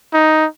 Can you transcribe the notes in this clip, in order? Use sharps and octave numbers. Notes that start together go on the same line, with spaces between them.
D#4